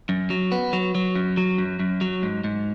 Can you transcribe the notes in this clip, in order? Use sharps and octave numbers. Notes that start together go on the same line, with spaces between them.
F#2
F#3
B3
F#3
F#3
F#2
F#3
F#2
F#2
F#3
G#2
G#2